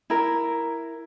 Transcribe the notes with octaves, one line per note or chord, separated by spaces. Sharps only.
E4 A#4